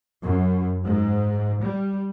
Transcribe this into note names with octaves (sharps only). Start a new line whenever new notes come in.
F#2
G#2
G3